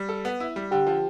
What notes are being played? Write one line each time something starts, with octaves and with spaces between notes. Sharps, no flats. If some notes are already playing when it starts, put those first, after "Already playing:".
Already playing: G3
A4
B3
E4
G3
D3 G4 G5
F3